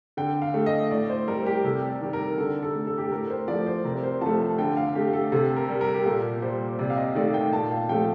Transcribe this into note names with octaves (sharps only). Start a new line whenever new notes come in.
D3 G5
F5
A3
D#5
A2 D5
C5
G3 A#4
G4
C3 A4
D5
D#3 G3
A#4
D3 A4
A4
A3
A4
G4
A4
A2 A#4
C5
F3 A3 D5
C5
C3 A#4
C5
F3 A3 A5
A5
D3 G5
F5
A3 G4
A4
C3 A4
A#4
G3
A#4
G4
A#2 A4
G3 C5
C3 D5
F5
D#5
D#3 A3 D5
G5
A#2 A5
F5
F3 A3 G5